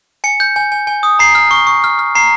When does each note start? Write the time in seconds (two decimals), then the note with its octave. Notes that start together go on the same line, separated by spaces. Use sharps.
0.24 G#5 C#7
0.40 G6
0.56 G#5
0.72 G#5
0.87 G#5
1.03 D#6
1.19 A#5 C7
1.35 F6
1.51 C#6
1.67 C#6
1.84 F6
1.99 F6
2.15 A#5 C7